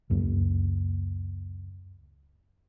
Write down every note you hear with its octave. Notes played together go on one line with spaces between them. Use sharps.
C#2 F#2 A#3